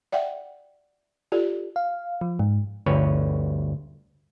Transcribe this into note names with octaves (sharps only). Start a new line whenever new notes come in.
D5 E5 F#5 G5
F4 G4 A4 D5
F5
F3
G#2
G1 D2 B4 C#5